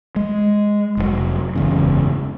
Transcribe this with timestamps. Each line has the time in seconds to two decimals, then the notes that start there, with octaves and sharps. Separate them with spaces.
0.16 G#3
0.97 F1 G#2 F#3
1.56 F#1 E2 G#2 C#3